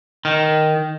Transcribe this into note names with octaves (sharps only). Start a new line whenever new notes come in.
D#3